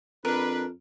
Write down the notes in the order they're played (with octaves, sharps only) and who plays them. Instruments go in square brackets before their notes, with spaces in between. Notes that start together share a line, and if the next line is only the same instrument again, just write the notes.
[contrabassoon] F2 [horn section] D4 B4 [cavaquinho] A#4